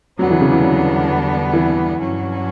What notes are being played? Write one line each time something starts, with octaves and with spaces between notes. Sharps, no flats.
E2 D3 F#3 G3 B3 D4
E3
C#3
E3
F#3
E3
G2 F#3 C#4 F#4